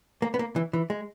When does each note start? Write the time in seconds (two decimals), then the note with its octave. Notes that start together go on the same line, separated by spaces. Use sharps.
0.22 A#3
0.34 B3
0.39 A#3
0.56 E3
0.73 E3
0.90 G#3